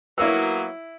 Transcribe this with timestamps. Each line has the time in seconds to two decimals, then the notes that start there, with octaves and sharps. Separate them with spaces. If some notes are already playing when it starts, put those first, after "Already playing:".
0.18 F#3 A#3 B3 E4 E6